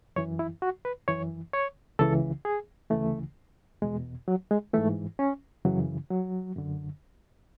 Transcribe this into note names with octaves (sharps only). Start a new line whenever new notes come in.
F#2 E3 C#5
E4
F#4
B4
F#2 E3 C#5
C#5
C#2 C#3 E3 A4
G#4
D2 C#3 E3 A3
E2 B2 G#3
F#3
G#3
G#2 E3 A3
C#4
F#2 C#3 E3 F#3
F#3
F#2 D3